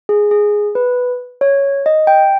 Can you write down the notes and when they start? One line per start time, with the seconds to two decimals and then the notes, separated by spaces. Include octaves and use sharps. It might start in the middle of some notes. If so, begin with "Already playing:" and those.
0.09 G#4
0.31 G#4
0.75 B4
1.41 C#5
1.86 D#5
2.07 G5